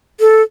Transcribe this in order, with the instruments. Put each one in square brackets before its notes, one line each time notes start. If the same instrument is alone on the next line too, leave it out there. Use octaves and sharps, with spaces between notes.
[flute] A4